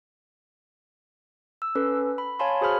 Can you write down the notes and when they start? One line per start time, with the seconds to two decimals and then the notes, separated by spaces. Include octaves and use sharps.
1.62 E6
1.75 C#4 A4 B4
2.18 B5
2.39 C#5 F5 G#5 A5 B5 C6
2.61 F#4 G#4 C5 B5 F6